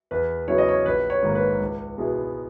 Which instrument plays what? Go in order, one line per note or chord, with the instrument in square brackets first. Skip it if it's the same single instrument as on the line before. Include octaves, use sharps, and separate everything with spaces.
[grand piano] E2 B4
C#3 F#3 B3 E4 C#5
D#5
C#5
A#1 B4
C#5
G#2 D#3 A#3
B4
C#2
B2 G#3 B3 E4